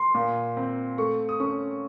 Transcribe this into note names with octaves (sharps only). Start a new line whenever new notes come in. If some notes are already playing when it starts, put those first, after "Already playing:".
Already playing: C6
A#2
C4
A3 C#6
D#6
C#4 C#6